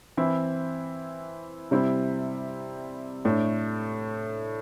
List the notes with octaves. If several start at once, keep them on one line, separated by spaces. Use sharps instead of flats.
E3 C4 E4
C3 G3 C4 E4
A2 A3 D4